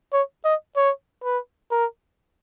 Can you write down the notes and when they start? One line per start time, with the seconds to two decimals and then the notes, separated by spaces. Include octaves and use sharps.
0.13 C#5
0.45 D#5
0.77 C#5
1.24 B4
1.71 A#4